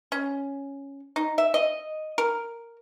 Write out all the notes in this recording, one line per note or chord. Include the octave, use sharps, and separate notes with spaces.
C#4
D#4
E5
D#5
A#4